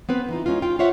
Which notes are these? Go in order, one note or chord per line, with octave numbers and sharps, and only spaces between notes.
B3 C4 B4 C5
E3 D#4 F4
G#3 C#4 D#4 F4
F4 G5
F4 C5 C#5 E5 F#5